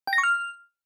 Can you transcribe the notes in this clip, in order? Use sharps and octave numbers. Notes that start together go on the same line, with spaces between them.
G5
A#6
C#6
F6